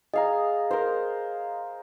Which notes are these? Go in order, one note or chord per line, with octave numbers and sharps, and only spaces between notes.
G#4 D#5 F5 A#5
A#4 C5